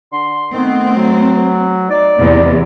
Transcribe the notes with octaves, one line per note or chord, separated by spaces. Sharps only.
D3 C6
D#3 A3 B3 C4
F#3
D#4 D5
E2 C3